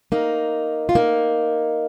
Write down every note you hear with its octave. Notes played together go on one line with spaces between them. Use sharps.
A#3 D#4
F4
A#3 D#4